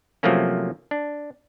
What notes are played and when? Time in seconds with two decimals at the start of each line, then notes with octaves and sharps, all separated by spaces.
0.23 C3 F3 F#3 A3 A#3 C#4
0.91 D4